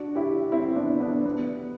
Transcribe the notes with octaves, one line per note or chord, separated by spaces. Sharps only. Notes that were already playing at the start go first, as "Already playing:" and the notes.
Already playing: D4 F#4
E4 G4
C4 E4
B3 D4
B3 D4
B3